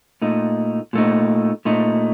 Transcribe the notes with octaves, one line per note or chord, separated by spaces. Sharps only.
A#2 A3 D#4
A#2 A3 D#4
A#2 A3 D#4